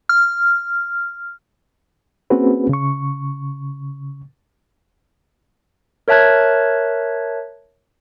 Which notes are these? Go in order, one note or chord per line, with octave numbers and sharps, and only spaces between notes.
F6
A#3 C4 C#4 F#4 G#4 B4
C#3 C#6
A#4 C#5 E5 A5 F#6 G#6